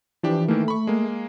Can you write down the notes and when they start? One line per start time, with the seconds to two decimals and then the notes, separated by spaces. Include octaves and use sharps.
0.23 E3 F3 D4 G4
0.48 D#3 E3 A3 A#3
0.68 B5 C#6
0.87 G#3 A#3